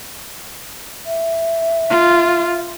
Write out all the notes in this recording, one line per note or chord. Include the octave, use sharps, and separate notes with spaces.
E5
F4